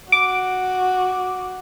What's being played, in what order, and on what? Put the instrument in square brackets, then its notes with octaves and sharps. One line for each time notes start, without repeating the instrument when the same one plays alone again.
[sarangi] F#4 [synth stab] D6